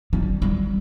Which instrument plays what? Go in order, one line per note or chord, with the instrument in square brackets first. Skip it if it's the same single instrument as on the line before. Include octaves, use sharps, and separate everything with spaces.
[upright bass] G3
G3